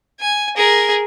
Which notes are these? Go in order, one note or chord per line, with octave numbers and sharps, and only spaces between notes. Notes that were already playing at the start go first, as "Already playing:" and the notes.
G#5
G#4 A#4